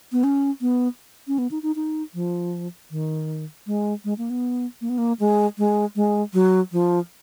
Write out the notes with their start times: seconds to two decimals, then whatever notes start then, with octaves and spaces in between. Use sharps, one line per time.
0.12 B3
0.24 C#4
0.61 B3
1.28 C#4
1.38 B3
1.51 D#4
1.63 D#4
1.76 D#4
2.14 F3
2.91 D#3
3.67 G#3
4.05 G#3
4.18 A#3
4.30 B3
4.81 A#3
4.89 B3
4.98 A#3
5.20 G#3
5.58 G#3
5.96 G#3
6.33 F#3
6.72 F3